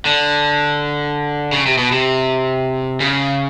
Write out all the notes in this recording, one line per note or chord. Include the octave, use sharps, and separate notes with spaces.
D3
C#3
C3
B2
C3
C#3